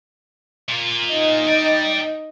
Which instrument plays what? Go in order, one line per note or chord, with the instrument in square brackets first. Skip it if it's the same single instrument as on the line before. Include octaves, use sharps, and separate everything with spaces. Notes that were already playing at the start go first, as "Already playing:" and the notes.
[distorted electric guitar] A#2 F4
[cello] D#4 D#5
[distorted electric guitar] D5 G5